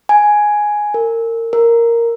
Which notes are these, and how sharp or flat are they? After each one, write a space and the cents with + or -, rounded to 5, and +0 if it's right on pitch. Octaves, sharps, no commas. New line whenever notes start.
G#5 +5
A#4 -30
A#4 -5